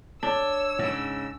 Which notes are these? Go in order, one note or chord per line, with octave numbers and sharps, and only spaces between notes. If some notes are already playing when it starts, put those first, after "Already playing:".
D4 C#5 E6
G#2 C#3